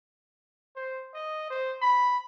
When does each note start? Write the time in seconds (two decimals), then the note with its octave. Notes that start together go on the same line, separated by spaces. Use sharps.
0.76 C5
1.15 D#5
1.50 C5
1.82 B5